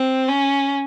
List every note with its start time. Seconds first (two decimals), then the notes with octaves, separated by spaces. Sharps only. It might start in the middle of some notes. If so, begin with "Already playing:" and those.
Already playing: C4
0.28 C#4